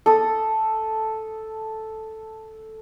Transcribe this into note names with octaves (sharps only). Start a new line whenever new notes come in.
A4 D#6